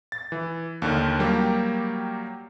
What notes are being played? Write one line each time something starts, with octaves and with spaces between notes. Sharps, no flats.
A6
E3
D#2 D3 D#3
F#3 G3 A#3 G4